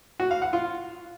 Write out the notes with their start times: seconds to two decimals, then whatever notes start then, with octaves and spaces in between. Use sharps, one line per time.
0.20 F#4
0.31 F5
0.42 F#5
0.53 F4